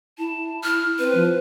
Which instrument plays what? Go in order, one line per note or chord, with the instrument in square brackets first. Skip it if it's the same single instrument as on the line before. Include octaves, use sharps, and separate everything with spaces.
[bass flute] E4 [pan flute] A5
[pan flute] F6
[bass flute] C4 [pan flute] B4
[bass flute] F3